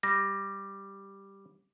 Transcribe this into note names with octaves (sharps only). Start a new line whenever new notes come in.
G3 A#6